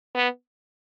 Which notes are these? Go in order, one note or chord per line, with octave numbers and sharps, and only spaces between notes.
B3